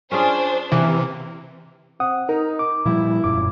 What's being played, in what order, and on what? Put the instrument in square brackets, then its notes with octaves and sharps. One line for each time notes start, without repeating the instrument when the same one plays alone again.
[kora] C#4 F4 G#4 [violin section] D4 C5
[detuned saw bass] C3 [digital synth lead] E3 [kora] A#3
[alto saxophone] C4 [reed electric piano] F#5 D#6
[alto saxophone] D#4 [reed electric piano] A#4
[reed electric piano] D6
[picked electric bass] A#2 F3 G3 [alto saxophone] E4
[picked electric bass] E1 F#2 A#2 [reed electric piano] D6